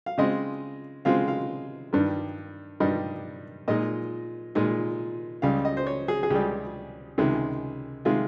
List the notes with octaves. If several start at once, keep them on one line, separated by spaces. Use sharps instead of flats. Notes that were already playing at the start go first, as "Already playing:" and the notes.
F5
C#3 G#3 C4 F4 D#5
C#3 G#3 C4 F4 F5
F5
G2 D#3 G3
G2 D#3 G3 D#5
A#2 G#3 D#4 D#5
A#2 G#3 D#4
C#2 C#3 G3 F5
D#5
C5
C#5
G#4
G#4
C#2 C#3 G3 G4
C#2 C3 D#3 G#3
C3 D#3 G#3 F4